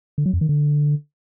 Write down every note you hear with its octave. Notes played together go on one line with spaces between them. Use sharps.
D3
F#3
F2
D#3
D3